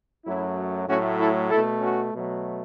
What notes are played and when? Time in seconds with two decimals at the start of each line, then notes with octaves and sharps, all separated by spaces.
0.25 F#2 F#3 A3 E4
0.87 A2 F#3 A3 C#4 F#4
1.19 E4 A4
1.50 B2 A3 E4 A4
1.81 C#4 F#4
2.13 B2 F#3 A3